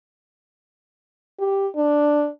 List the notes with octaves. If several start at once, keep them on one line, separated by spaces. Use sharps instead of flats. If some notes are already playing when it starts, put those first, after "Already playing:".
G4
D4